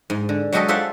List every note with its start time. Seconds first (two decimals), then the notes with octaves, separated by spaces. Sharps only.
0.10 G#2
0.29 D3
0.53 F#3 G#3 F#4 G4 A4 D#5
0.68 F4 G4 A4 C5 E5 F#5